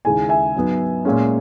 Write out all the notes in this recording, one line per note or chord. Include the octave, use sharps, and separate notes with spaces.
D#2 C#3 G#3 C#4 E4 G#5
E5 G#5
G#2 F#3 B3
A#2 G#3 C#4